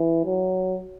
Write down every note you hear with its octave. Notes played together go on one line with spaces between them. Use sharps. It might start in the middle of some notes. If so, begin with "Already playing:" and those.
Already playing: E3
F#3